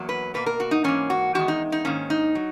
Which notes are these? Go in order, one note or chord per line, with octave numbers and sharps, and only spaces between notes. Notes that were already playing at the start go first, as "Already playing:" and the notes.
Already playing: E2 F#3 A#3
B4
B2 A#3 B4
A#4
F#4
D#4
G#2 E3 A#3 C#4
F#4
E2 D#3 G#3 F#4
D#4
D#4
G#2 D#3 A#3 C#4
D#4
F#3